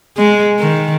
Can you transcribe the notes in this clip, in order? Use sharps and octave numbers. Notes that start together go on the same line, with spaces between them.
G#3
D#3